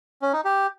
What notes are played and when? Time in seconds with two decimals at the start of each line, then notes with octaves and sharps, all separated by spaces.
0.22 C#4
0.33 D#4
0.45 G4